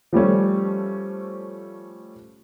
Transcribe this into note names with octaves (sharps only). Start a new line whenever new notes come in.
F3 G3 A3 C#4